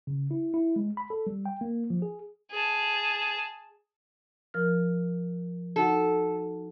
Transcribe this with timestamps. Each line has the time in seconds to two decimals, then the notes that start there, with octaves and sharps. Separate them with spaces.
0.07 C#3
0.31 E4
0.54 E4
0.76 G#3
0.97 B5
1.10 A4
1.27 G3
1.46 G5
1.61 A#3
1.90 F3
2.02 G#4
2.51 G#4 A5
4.54 F3 A#4 F6
5.76 D#4 F#4 A4 F#5